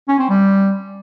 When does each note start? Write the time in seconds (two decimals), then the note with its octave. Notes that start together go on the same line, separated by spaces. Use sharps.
0.09 C#4
0.19 C4
0.30 G3